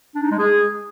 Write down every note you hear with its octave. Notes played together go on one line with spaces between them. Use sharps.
D4
D#4
G#3
G#4